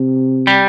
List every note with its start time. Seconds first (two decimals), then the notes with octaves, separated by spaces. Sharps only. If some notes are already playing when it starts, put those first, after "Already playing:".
Already playing: C3
0.47 G3